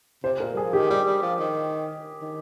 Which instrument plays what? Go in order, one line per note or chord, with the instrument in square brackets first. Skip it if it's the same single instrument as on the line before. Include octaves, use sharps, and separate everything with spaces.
[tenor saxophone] C3 [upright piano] C5
[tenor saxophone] A#2 [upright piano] A#4
[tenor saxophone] G3 [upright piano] G#4
[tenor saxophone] F3
[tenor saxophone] D#3 [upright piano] G4
[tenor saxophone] G3 [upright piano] G4
[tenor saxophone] G3
F3
D#3
D#3